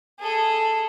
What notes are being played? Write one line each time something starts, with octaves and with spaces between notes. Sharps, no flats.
G#4 A4